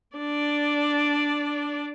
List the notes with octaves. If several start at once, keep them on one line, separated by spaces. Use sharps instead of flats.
D4 D5